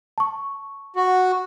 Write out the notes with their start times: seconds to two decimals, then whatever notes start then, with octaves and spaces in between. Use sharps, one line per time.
0.18 A5 C#6
0.96 F#4